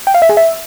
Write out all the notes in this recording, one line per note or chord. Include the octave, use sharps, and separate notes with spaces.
G5
F5
E5
G#4
E5